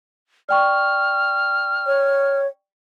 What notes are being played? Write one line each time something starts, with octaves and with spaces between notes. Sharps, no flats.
D5 G5 C#6 F6
C#5